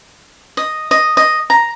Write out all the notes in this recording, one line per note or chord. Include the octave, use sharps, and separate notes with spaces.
D#5
D#5
D#5
A#5